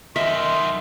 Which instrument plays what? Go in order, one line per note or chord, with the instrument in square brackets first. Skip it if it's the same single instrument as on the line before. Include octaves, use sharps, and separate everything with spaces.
[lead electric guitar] F#2 D#3 [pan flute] D#5 [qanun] E5 [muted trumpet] C6